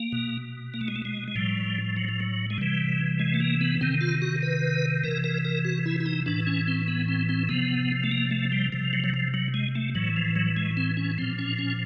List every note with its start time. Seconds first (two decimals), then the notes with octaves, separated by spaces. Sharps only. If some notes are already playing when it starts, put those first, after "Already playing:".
Already playing: A#3
0.12 B2
0.74 A#3
0.81 A3
0.88 G#3
0.96 A3
1.05 G#3
1.28 G#3
1.36 A2 F3 G3
1.96 F#3
2.09 F3
2.20 F#3
2.50 G#3
2.58 C3 E3 G3
3.19 G#3
3.34 A3
3.40 A#3
3.61 B3
3.81 C3 D#3 C4
4.01 F4
4.22 F#4
4.42 B4
5.04 C3 E3 A#4
5.24 A#4
5.45 A#4
5.65 F#4
5.86 E4
6.00 E4
6.06 D#4
6.26 A2 E3 D4
6.47 C#4
6.68 C4
6.88 B3
7.08 C4
7.29 C4
7.49 C3 F3 B3
8.04 A3
8.11 A#3
8.31 A3
8.52 G3
8.72 C3 F3
8.93 F#3
9.04 F#3
9.14 F3
9.34 F#3
9.54 G#3
9.75 A3
9.95 A2 E3 F#3
10.16 F3
10.36 F#3
10.57 G#3
10.77 C4
10.97 C#4
11.18 A#2 F3 C4
11.39 C#4
11.59 C#4